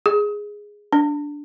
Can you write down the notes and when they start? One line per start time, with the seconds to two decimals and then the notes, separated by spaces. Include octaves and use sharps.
0.06 G#4
0.93 D4